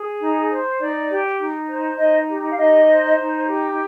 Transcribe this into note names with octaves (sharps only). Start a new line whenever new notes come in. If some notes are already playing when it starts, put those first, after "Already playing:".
Already playing: G#4
D#4
C5
D#4 D5
G4
D#4
C5
D#4 D#5
G4
F5
D#4 D#5
C5
D#4
G4